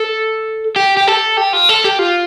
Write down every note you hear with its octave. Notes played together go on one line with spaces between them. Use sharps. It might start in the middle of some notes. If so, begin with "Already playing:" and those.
Already playing: A4
G4
G4
A4
G4
F4
A4
G4
F4